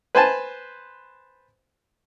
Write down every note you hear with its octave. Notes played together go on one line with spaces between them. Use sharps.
B4 C5 G#5 A5